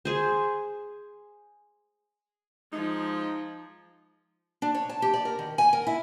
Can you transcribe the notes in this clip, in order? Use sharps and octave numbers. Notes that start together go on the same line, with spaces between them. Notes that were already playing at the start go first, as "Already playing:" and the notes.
G#4 C5
F3 G#3 D#4
D4
C#5
A5
G4
D5
A#4
D#3
G#5
A#4
E4